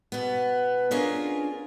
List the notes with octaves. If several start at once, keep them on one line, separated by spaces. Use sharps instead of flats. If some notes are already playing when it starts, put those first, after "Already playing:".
B2 B3
C#4 D4 F4 G#4 A#4